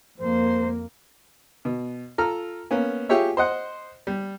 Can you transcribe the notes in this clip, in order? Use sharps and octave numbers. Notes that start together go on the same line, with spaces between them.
F2 A#3 C5
B2
F4 A4 A#5 F6
A#3 B3 C#4
F4 G4 G#4 C#5 E5
C5 D#5 F#5
G3